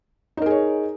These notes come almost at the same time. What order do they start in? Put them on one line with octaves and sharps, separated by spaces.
D#4 A#4 G#4 C#5